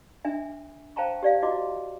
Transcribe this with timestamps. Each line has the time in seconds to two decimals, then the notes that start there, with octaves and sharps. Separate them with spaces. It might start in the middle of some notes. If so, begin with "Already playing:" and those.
0.25 D4 E5 G#5
0.96 C5 F5 G5 A5 A#5 C#6
1.23 G4 D5 F5
1.42 E4 F#4 D#5 D6